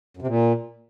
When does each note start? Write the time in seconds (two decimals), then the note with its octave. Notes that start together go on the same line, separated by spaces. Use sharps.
0.17 F#2
0.22 C3
0.27 A#2